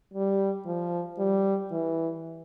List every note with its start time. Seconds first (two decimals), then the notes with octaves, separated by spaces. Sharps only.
0.14 G3
0.66 F3
1.18 G3
1.71 E3